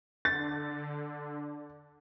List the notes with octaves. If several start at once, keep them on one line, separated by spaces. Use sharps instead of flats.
D3 A6